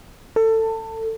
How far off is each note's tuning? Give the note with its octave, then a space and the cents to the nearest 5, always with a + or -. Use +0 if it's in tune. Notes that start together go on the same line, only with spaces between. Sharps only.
A4 +25